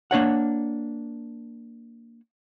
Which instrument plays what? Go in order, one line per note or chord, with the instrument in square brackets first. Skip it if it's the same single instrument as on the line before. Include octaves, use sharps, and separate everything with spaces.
[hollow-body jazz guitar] A#3 D4 C#5 F#5